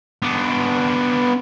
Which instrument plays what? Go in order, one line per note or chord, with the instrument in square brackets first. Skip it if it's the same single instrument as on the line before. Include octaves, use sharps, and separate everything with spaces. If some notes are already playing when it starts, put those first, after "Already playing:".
[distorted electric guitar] B3 D4